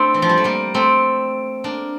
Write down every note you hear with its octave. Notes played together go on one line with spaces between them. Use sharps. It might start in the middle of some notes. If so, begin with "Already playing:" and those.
Already playing: A3 C4 D4 E4
E3
F3
G3
A3
G3 A#3
A3 C4
A#3 D4